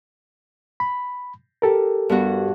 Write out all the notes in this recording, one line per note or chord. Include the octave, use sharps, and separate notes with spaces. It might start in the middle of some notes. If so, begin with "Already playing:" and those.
B5
G4 A4 A#4
G2 B3 F#4